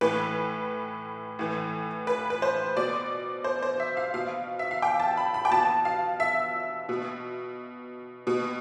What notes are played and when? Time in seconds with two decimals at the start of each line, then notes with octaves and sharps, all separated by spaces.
0.01 A2 E3 B4
1.39 A2 E3
2.07 B4
2.30 B4
2.42 C5
2.76 B2 D5
3.44 C5
3.63 C5
3.80 E5
3.97 F5
4.14 B2 F5
4.59 E5
4.71 F5
4.82 G5
5.00 A5
5.17 B5
5.34 B5
5.45 G5
5.51 B2 A5
5.85 F5
6.20 E5
6.89 B2
8.27 B2